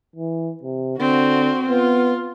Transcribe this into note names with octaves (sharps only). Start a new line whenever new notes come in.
E3
C3
D3 C4 F#4
B3 F4